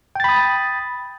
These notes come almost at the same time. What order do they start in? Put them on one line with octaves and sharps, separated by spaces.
G5 A6 B5 D#6